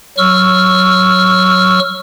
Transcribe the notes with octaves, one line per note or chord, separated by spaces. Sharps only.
F#3 C#6 E6 F6